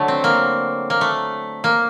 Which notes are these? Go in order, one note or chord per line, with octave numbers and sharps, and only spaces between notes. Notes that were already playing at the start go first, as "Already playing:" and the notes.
Already playing: D3 F#3 A3
C4
A#3
A#3
A3
A#3